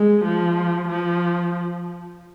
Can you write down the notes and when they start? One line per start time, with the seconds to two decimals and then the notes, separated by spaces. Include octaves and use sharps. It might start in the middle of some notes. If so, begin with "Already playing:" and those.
Already playing: G#3
0.25 F3
0.89 F3